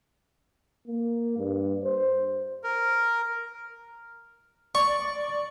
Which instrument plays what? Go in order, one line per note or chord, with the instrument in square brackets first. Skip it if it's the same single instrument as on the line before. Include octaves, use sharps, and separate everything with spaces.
[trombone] A#3
G2
C5
[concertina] A#4
[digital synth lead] D5 [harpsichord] C#6